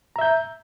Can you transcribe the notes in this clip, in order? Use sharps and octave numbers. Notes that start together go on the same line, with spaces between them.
E5 A#5 G6